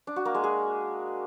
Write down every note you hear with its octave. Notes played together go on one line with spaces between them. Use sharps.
D4
F#4
A#3
G#3
G#4